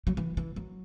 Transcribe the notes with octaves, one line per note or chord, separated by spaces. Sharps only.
F#3
E3
E3
F#3